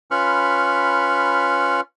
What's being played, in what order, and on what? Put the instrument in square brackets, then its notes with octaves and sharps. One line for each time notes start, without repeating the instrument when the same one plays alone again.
[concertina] C#4 F4 B4 B5 C#6 F6